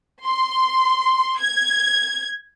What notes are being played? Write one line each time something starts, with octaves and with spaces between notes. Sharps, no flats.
C6
G#6